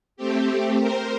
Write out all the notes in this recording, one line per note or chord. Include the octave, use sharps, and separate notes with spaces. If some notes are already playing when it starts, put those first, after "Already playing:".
A3 C4 G4
A#4 C5